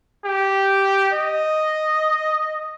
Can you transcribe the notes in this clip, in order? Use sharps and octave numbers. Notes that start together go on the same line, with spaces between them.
G4
D#5